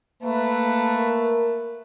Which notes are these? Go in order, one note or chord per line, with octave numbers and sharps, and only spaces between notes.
A3 A#3 B4
A#4